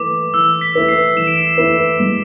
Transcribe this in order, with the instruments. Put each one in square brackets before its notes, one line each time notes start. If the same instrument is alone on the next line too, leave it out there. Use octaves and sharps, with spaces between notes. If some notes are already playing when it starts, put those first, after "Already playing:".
Already playing: [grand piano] E3 A3 E4 B4 [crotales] D6
[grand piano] E3 [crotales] E6
[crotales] B6
[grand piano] A3 E4 B4
[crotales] C7
[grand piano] E3 [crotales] E7
[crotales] D7
E7
[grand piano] A3 E4 B4
G#3